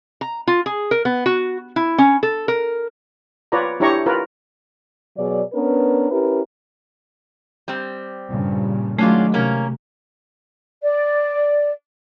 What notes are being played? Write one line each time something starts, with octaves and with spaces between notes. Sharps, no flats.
A#5
F4
G#4
A#4
B3
F#4
E4
C#4
A4
A#4
F4 B4 C#5 D5 A#5
D4 E4 G4 C#5 A#5 C#6
F4 A#4 B4
B2 F#3 G#4 D5
B3 C#4 D4 A#4 B4
C#4 E4 G4 A#4 B4
G3 C4
G2 A#2 C#3
D#3 F#3 G#3 A3 C#4 D4 F4
C3 A#3 C#4 A#4
D5